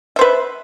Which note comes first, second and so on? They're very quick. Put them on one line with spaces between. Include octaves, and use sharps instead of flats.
E5 C5 B4